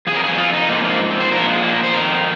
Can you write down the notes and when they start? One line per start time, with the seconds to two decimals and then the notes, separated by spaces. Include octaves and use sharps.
0.07 F3 G#4
0.12 F2 A#4
0.24 G#4
0.38 F4
0.53 D#4
0.69 G#2 F3 A#3
0.84 A#3
1.11 C4
1.20 C5
1.31 A#2 F3 A#4
1.47 G#3
1.63 A#3
1.69 G#4
1.73 A#4
1.83 C5
1.93 F2 D#3 A#4